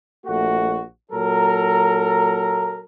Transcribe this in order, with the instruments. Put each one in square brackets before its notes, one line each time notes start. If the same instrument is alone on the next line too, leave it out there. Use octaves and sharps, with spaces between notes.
[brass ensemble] A#1 A3 F#4
A#2 F#3 A4 A#4 A#5